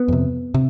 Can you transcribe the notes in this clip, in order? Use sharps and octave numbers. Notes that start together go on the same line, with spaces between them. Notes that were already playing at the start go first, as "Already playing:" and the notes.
Already playing: B3
F2 C3
C3